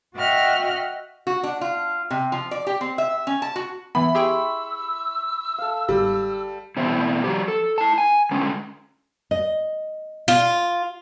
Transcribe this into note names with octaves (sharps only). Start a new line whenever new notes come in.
F#4 D#5 E5 F#5 G5 F6
F#4
D4
F4
C3
F3
D5
G4
C4
E5
C#4
A5
F#4
E3 B3 E4 B5
G4 G#4 G5 C6 C#6 E6
A4 F5
G1 G#2 G3
B2 E3 C4 E4
F3 F#4 G4
A4
E4 A5
G#5
D3 G#3 C#4
D#5
F4